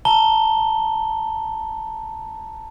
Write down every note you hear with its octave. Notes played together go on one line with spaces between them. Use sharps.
A5 A#5 G7